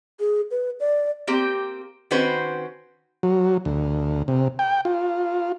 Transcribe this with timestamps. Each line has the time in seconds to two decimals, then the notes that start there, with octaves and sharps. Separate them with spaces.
0.20 G#4
0.51 B4
0.80 D5
1.27 A#3 C4 G4
2.11 D#3 C4 C#4 F#4 B4 C5
3.23 F#3
3.65 D2
4.28 C3
4.59 G5
4.85 F4